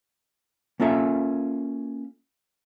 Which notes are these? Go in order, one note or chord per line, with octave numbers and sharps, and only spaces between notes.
A#3 C#4 F4 A4 E5